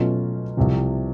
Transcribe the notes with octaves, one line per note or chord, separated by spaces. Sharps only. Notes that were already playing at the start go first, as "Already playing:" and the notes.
Already playing: B2 F#3 A3 C#4 F4
C2 C3 F3